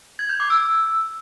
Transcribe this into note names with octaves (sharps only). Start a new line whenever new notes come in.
G#6
G6
D6
E6